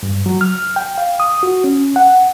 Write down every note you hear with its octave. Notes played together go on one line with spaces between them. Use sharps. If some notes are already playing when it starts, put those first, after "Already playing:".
G2
F#3
F6
G5
F5
D#6
F#4
C#4
F#5